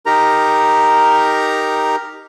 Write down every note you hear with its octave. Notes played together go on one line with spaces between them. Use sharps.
D#4 G4 A#4 A#5